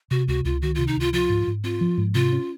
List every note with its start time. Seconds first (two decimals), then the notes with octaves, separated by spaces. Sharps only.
0.11 C3 F#4
0.28 C#2 F#4
0.45 C#2 F4
0.62 D#3 F#4
0.75 C3 F4
0.88 D#4
0.96 C#2 F4
1.13 F3 F4
1.30 G#2
1.47 G#2
1.64 C4 F4
1.81 F3
1.98 G#2
2.15 C3 F4
2.32 C#4